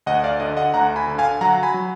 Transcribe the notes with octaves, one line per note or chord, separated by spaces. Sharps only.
D2 D#5 F#5
D5 F5
D3 D#5
D#5 F#5
D2 F#5 A#5
G#5 B5
D3
F5 G#5
F#3 F#5 A#5
G#5 B5
F#3